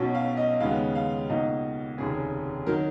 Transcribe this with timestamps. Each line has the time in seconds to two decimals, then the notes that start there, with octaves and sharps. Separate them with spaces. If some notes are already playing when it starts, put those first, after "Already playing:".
Already playing: B1 B2 F#3 C#4
0.15 F5
0.37 D#5
0.60 D#2 C#3 G#3 B3 F5
0.95 F5
1.29 C#2 B2 A#3 D#4 D#5
1.98 F1 D#2 C#3 G#4
2.67 D#3 F#3 A#4